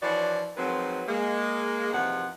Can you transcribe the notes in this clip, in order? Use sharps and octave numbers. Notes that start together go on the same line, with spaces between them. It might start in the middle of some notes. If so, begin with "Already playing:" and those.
E3 F3 D4 F#4 C#5 D5
D#3 F3 F#3 G#3 C4 B4
G#3 A#3
E2 C3 D#3 F3 F#5